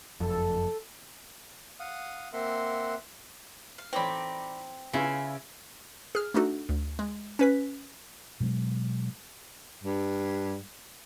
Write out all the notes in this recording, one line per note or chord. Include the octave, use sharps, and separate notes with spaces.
F#1 F2 A4
F5 F#5 D#6
A#3 C4 A#4 E5 F#5 C6
F5
A1 C4 D#4 C#5 D5 G5 B5
C#3 B3 E4 F4 E5 G#5
G#4 F6
A3 D4 D#4 F#4 A4
D2
G#3
C#4 B4 B6
B2 F#3 G#3 B3
G2